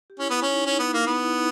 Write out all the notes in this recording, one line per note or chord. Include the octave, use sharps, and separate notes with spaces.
G4
C#4 E4
B3
C#4
D#4
C#4
D#4
B3 E4
A#3
B3
D#4
E4
D#4